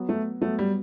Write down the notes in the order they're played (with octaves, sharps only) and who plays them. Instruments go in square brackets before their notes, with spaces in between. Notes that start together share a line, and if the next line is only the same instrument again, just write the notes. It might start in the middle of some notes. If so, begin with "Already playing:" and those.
Already playing: [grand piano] F#3 B3 F#4
[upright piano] A3
[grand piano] F#3 B3 F#4 [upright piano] A3
[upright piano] G3